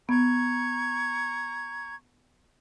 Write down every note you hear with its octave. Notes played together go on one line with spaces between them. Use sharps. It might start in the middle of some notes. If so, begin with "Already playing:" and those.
B3 A#5 C#6 G#6